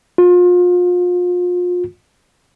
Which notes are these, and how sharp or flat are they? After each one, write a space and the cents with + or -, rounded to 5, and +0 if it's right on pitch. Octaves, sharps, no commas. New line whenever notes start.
F4 +35